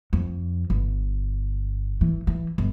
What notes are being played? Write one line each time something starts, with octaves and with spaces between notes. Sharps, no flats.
F2
G1
E3
E3
G1